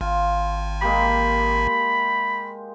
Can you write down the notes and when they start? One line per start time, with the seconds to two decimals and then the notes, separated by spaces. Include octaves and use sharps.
0.01 G#1 F4
0.82 G#3 A#3 G4 B5